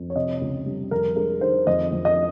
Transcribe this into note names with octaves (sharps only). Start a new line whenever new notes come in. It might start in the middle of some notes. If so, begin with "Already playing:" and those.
Already playing: F2
C#5
C3 D#5
C#2
G3
F2 A#4
G#3 A#4
D#3 C5
F2 D#5
F2
D#5